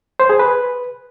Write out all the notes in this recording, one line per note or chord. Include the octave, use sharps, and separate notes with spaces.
C5
G#4
B4